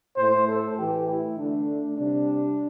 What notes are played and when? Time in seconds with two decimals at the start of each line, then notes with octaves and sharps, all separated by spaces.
0.17 A2 A3 C5
0.47 A4
0.77 A2 E3 A3 G4
1.08 E4
1.37 D3 A3 D4
1.97 C3 G3 D4